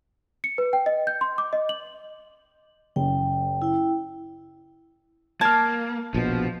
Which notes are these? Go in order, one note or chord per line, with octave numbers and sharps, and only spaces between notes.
C#7
B4
G5
D#5
G6
C6
D6
D#5
F#7
F#1 G5
E4 G5
A#3 A5 F6 G#6
A#1 B2 F3